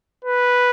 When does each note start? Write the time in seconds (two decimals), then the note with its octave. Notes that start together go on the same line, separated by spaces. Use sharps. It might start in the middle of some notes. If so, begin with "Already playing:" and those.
0.25 B4